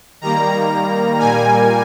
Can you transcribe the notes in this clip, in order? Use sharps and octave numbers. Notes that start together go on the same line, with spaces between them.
D#3 G3 A#3 A#5
A#2 G3 A#3 G#5